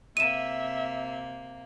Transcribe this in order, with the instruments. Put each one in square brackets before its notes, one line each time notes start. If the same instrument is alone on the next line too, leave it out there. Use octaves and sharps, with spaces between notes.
[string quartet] C3 A#3 [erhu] E5 [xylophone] D#7 E7